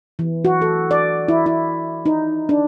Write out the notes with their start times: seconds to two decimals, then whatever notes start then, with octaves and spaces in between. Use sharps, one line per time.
0.19 E3
0.45 F#4
0.62 A4
0.91 D5
1.28 E4
1.46 E4
2.06 D#4
2.49 D4